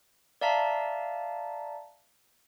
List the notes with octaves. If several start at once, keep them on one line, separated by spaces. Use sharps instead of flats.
D5 E5 F5 A5 A#5 B6